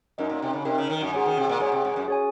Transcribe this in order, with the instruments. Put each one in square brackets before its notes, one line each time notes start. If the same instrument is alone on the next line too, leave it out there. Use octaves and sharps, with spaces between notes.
[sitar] F#2 [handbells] D#4 A#4 D#5
[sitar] A#2
C3
C#3
[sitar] C3 [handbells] D#4 A#4 D#5
[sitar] C#3
D#3
F#2
[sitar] G#2 [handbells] G#4 C#5 G#5
[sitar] D#3
C3
A#2
[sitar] G#2 [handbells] G#4 C#5 G#5
[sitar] C3
G#2
F#2
[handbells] G#4 C#5 G#5